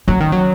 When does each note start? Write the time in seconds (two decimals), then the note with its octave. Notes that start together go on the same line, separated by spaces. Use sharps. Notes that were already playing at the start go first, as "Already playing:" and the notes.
0.08 F#3 C#4
0.20 D#3
0.32 F#3